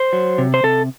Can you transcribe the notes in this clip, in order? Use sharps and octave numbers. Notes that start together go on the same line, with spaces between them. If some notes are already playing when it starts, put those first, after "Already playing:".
Already playing: C5
F#3
C3
C5
C3 A4